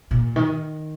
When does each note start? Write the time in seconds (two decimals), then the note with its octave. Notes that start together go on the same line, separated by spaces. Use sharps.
0.11 A#2
0.36 D#3